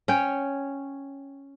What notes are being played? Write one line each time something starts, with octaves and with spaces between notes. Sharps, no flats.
C#4 C#5 G5